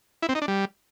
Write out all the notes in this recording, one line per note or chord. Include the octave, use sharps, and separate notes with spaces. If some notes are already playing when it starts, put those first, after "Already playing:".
E4
C4
D#4
D4
G3